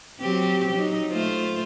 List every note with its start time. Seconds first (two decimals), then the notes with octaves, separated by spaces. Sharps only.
0.20 F#3 C4 G4
0.73 F#3 D#4
1.12 A3 F4 C5